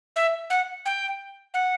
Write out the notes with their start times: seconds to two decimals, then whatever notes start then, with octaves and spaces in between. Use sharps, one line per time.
0.16 E5
0.50 F#5
0.86 G5
1.54 F#5